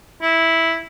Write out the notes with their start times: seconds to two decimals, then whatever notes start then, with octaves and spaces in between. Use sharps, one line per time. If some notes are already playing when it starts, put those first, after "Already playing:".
0.22 E4